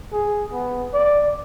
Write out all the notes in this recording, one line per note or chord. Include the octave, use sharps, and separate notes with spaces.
G#4
B3
D5